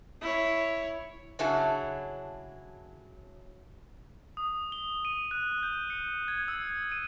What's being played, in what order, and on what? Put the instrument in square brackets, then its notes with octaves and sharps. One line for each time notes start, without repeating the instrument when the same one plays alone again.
[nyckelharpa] E4 C#5
[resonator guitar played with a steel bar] C#3 F#3 D4 E4 G#4 A4
[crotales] D#6
G7
D#7
F#6
G6
C#7
G#6
E6
D#7